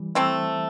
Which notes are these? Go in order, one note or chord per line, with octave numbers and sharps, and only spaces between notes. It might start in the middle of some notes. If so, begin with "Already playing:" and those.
Already playing: E3 G3
A3 C4 E4